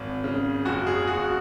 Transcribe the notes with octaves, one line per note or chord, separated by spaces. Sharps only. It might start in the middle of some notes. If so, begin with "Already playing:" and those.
Already playing: G#1
C#3
F#1 F#4
G#4
F#1 F#4